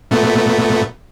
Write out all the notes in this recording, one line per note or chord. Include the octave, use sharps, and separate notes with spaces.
A#2 A3 B3